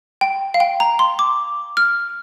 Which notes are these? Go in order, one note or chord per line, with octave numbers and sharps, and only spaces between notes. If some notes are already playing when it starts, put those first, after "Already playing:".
G5
F5
G5
A#5
C6
D6
F6